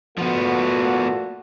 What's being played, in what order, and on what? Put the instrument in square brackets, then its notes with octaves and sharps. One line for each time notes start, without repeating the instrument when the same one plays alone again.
[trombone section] A#2 A3 F#4 [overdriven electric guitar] F3 B3